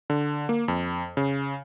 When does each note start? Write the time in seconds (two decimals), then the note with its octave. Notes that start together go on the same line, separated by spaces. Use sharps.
0.10 D3
0.49 A#3
0.68 F2
1.17 C#3